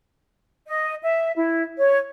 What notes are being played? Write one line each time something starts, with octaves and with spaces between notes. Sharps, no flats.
D#5
E5
E4
C#5